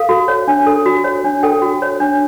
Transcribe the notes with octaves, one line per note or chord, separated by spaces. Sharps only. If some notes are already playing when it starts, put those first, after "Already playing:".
Already playing: A4 F5
F#4
C#5
D4
A4
F#4
C#5
D4
A4 G5
F#4
C#5
D4